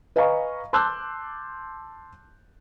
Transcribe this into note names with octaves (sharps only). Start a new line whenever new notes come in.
B4 D#5 F5 G#5 A#5 C#6
A5 C6 D6 E6 F#6 G6